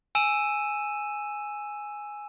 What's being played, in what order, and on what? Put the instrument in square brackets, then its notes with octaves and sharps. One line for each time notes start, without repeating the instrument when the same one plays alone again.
[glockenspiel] G#5 E6 D#7 E7